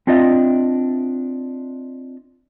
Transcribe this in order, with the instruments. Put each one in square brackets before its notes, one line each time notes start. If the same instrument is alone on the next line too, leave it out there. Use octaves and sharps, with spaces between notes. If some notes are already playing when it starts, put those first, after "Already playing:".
[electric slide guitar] C4 D4 F4 D#5 E5